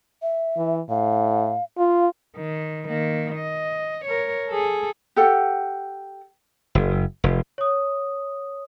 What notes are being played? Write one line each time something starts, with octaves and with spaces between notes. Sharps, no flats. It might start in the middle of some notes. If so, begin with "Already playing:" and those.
E5
E3
A2 F5
F4 F5
D#3
D#3 A#3
D#5
A#4 C#5
G#4 A4
G4 A4 F#5
F#1
F1
C#5 D#6